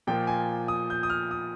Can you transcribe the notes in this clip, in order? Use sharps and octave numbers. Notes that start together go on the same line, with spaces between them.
A#2 F3 A#3 G5
G#5
D#6
G6
D#6
F6
D#6